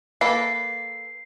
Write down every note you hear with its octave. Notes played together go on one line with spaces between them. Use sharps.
A#3 A4 B4 C7